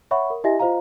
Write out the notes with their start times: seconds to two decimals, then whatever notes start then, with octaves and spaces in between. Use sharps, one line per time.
0.11 C#5 E5 F#5 B5 C#6
0.30 A#4
0.44 E4 G4 D#5 E5 G#5 A#6
0.59 F4 C5 D#5 F5 A#5